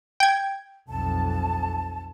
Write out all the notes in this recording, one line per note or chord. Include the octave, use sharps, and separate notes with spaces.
G5 G#6
B1 F2 A5